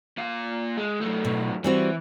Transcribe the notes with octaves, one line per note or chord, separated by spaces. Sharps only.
A#2 F5
G#3
F#2 A3
B2
E3 G3 C4 F#4